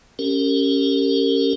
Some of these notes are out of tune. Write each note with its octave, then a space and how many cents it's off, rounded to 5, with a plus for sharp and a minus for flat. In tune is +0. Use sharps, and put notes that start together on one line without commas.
C#4 +0 G4 +0 A#4 -30